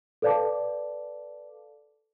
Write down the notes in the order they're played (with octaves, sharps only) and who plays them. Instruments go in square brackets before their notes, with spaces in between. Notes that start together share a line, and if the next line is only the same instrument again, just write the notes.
[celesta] A4 B4 D5 F5 A5 D6